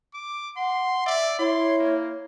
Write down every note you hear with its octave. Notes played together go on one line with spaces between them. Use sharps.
D6
F#5 C6
D5 E5
E4 C#5 C6
A#3